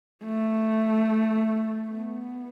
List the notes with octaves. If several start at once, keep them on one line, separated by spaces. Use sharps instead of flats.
A3
B3